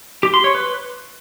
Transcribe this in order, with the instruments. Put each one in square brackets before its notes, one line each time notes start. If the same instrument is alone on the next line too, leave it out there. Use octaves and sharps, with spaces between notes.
[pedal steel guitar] G4
C6
C#5
B4